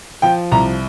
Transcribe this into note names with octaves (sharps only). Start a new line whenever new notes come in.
F3 G5
C2 A#5